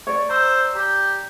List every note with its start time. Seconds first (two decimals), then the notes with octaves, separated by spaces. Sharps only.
0.07 C#5 D5
0.29 C5 A#5 E6
0.75 G4 A#5